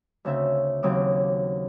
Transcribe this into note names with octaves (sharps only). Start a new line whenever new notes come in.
D2 C#3 C4 E5
D#2 C#3 F#3 C4 D6 D#6